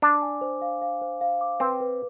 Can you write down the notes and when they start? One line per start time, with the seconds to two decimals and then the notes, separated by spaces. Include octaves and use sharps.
0.02 D4 D6
0.22 G#5
0.41 C5
0.62 F5
0.82 F5
1.02 C5
1.21 F5
1.41 D6
1.60 C4 B4
1.80 B4